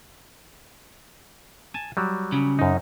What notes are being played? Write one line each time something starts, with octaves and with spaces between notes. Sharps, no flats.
G#5 A5
F#3 G3
C#3
F#2 D#4